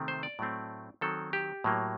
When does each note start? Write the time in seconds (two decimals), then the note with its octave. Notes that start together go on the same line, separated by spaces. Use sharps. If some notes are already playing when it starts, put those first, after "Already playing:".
Already playing: C3 D#3 A3 C4
0.08 C5
0.23 D5
0.39 A2 F#3 A3 C4
1.01 D#3 F#3 C4 A4
1.33 G4
1.64 A2 F#3 A#3